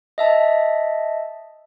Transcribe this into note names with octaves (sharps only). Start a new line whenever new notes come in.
D#5 E5 A5